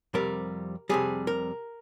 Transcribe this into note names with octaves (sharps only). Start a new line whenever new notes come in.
F2 C3 G3 A#4
F2 C3 G3 G#4
A#4